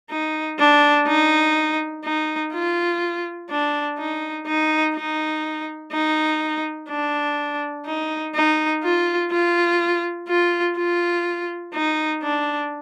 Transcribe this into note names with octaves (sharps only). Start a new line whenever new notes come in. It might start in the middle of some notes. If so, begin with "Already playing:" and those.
D#4
D4
D#4
D#4
F4
D4
D#4
D#4
D#4
D#4
D4
D#4
D#4
F4
F4
F4
F4
D#4
D4